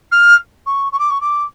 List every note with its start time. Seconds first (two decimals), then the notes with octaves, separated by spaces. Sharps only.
0.11 F6
0.66 C#6
0.92 C#6
0.99 D6
1.10 C#6
1.21 D6